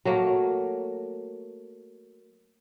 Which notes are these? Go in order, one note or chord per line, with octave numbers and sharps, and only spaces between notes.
F#3 A3 A#3